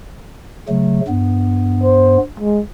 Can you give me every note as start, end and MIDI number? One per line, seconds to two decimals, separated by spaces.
0.69 1.01 49
0.69 1.01 54
0.69 1.01 57
1.08 2.17 43
1.08 2.17 59
1.84 2.21 72
2.40 2.61 56